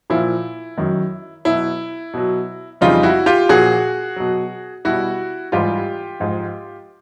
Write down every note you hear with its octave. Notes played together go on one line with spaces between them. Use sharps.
A#2 F3 E4
F#2 D#3 F#3
B2 F#3 E4
B2 F#3
F2 C#3 E3 G3 D#4 F4
E4 F#4
F4 G4
A#2 F3 F#4 G#4
B2 F#3
B2 G3 E4 F#4
G#2 E3 G3 F4 G4
G#2 F3